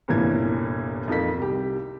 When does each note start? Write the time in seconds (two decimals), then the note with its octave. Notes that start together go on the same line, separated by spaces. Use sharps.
0.08 G1 C2 A#2 E3 G#6
1.08 F2 D#4 F4 A#4 B6
1.38 C2 G4